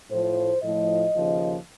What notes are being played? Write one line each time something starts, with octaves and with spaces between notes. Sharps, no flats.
A2 F3 C5
A2 F3 D#5
D#2 C#3 F3